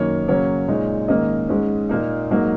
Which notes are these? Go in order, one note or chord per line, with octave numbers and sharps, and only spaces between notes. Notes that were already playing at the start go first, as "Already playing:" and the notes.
Already playing: F#2 D#3 A#3 C#5
C#3 F#3 A#3 C#4 C#5
A#2 G#3 D#4
G#2 D#3 A#3 C#4 D#5
G#2 G#3 C#4
A#2 A#3 D#4
G#2 F#3 A#3 D#4